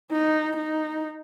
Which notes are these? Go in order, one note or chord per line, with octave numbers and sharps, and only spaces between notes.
D#4
D#4